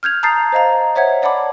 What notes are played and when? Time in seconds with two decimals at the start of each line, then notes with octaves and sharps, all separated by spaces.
0.03 F6 G6 G#6 F7
0.23 A5 A#5 D#6 G6 A6 C7
0.52 C5 D#5 F5 A#5
0.95 C5 C#5 E5 F#5 G#6
1.22 C#5 D5 F#5 A5 B5 D6